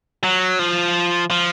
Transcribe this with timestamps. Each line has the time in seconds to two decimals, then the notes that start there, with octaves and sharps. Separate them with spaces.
0.24 F#3
0.59 F3
1.31 F3